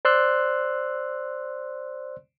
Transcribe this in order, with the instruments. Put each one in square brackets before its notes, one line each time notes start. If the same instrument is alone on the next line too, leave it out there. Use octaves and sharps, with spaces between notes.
[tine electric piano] C5 D5 C6 E6 F#6